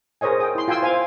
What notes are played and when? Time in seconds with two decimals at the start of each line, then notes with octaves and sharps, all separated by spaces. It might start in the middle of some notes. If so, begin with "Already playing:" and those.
0.21 G#4 A#4 C5 C#5 D#5 G#5
0.40 G5 D#6
0.55 E4 C6
0.68 F4 G5 G#5 C6 E6
0.82 C5 F5 G#5